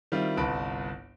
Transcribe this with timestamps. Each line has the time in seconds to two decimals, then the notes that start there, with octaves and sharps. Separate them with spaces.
0.12 D#3 G3 C4 E4 F4
0.37 G1 C2 B4 A5 B5 D7